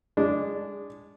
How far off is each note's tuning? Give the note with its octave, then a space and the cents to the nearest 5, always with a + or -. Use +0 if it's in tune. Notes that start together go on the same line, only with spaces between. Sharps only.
G#3 -25 D4 -15